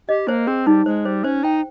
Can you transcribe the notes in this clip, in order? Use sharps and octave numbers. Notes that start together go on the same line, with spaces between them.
G4 D#5
A#3 C5
C4 G#4
G3 D#4
G#3 C5
G3 C5
C#4 C5
D#4 G5